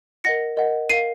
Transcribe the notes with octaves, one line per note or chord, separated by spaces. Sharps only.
A#4 D#5 F#5 A#6 C#7
A#4 D#5 F#5
A#4 F5 C7 D#7